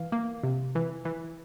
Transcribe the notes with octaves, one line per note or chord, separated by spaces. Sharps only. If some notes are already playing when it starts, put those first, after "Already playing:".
Already playing: E3 F5
A#3
C3
E3
E3